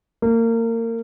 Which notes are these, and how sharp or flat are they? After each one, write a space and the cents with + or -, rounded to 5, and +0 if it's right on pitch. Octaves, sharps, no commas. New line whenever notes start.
A#3 -30